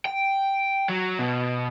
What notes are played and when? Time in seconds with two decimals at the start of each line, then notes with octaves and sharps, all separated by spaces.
0.05 G5
0.89 F#3
1.19 B2